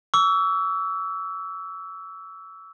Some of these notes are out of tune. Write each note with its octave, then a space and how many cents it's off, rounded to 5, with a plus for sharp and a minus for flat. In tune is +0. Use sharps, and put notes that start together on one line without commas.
C#6 +45 E6 +0